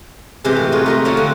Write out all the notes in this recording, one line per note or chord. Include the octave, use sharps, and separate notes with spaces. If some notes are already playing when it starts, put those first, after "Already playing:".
C3 E3 G#3 F4 G4 C5
A2
G#3 D#4 F4 F#4
A3 A#4 D#5
C4 F4 C#5 F5
D3 F#3